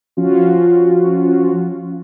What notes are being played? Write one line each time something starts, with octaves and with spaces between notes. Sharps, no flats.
F3 C#4 F4 F#4